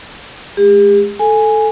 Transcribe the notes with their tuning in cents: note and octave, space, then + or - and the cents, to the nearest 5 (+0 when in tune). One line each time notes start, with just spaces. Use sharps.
G#3 +30 G4 +45
A4 +0 G#5 +0